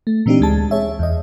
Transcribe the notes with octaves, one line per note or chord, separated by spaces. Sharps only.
A3
A#2 E3 C4 D4 D#4 G4
D2 G#3 A5
G#4 C#5 E5
E2 D#5